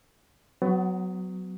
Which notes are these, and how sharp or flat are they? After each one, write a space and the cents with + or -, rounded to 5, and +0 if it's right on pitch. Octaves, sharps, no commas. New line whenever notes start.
F#3 +0 B3 +30 F#4 +0